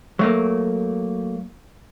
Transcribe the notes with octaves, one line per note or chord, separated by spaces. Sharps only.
F#3 A3 A#3